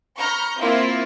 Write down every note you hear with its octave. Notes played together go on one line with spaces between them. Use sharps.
A#5 B5 C#6 F6 G6
A#3 C4 E4 F4